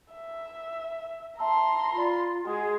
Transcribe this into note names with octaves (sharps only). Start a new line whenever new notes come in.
E5
E5 A5 A#5 C6 E6
F4 D5 B5
G#3 F#4 G#4 F#5